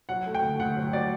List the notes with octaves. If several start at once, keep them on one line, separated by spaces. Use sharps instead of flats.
F#3 F#5
A3
G5
D2
D2 F#5
F#3
F#3 D5